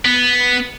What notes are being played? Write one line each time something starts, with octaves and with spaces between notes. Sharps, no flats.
B3